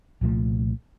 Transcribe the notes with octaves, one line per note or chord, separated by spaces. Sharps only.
C2 A#2 F3 A3